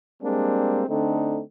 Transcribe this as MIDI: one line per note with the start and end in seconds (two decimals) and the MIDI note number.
0.22 0.83 55
0.22 0.83 56
0.22 0.83 58
0.22 0.83 60
0.22 0.83 62
0.88 1.40 50
0.88 1.40 57
0.88 1.40 60
0.88 1.40 62
0.88 1.40 63